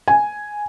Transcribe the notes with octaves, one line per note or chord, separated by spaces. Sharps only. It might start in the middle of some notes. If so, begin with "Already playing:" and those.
G#5